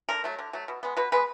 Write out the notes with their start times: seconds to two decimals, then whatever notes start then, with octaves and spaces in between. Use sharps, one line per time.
0.09 D3 A#4
0.24 F#3 A3
0.39 D3
0.53 F#3 A3
0.68 B2
0.83 G#3 B3
0.97 B2 B4
1.12 G#3 B3 B4